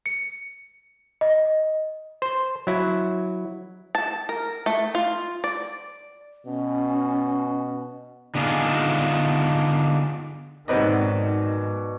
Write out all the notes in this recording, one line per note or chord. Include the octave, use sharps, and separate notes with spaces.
C#7
D#5
C5
F#3 E4
A5
A#4
A3
F4
D5
B2 C#4
D3 B3 D4 D#4 F4 G#4
G#2 B2 D#3 F#3 C4 B4 D5 D#5